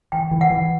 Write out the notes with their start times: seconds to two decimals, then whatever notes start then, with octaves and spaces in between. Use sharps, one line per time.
0.12 E3 G5
0.31 E3
0.41 F#5
0.50 E3